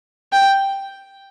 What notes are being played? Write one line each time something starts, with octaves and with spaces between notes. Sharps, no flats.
G5